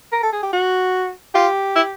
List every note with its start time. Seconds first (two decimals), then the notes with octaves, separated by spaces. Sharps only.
0.12 A#4
0.23 A4
0.33 G#4
0.43 G4
0.53 F#4
1.35 F4 G4
1.76 E4